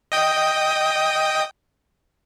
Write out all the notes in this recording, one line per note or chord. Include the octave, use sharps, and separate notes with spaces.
D#5 G5 D#6